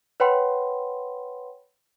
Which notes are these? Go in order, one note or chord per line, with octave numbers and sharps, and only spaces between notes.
B4 C#5 F#5 G5 B5 C6